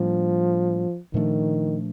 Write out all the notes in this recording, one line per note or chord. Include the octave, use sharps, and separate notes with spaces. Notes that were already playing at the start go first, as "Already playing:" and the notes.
Already playing: A2 F3 G3 A#3 D4
A#2 D#3 F3 A3 D4